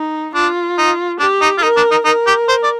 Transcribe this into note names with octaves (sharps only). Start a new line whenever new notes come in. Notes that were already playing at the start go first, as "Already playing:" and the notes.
Already playing: D#4
D4 F4
D#4
D4 G4
D#4
F4
D#4 A#4
D4
D#4
D#4 A#4
G4
C5
D5